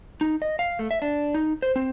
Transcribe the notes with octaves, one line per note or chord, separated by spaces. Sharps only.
D#4
D#5
F5
A3
E5
D4
D#4
C5
C4